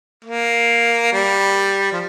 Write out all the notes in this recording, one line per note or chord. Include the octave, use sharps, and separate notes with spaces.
A#3
G3
F3